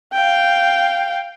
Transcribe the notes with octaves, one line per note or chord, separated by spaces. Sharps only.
F5 G5